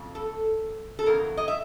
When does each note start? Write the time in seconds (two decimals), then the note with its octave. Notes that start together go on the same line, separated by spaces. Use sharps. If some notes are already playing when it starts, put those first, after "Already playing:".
Already playing: F2 C#3
0.15 A4
0.99 A4
1.06 E2 C#3 F#3 A#4
1.37 D#5
1.48 E5